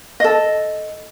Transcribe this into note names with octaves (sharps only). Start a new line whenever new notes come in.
A4 D#5